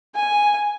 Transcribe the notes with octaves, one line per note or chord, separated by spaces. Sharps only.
G#5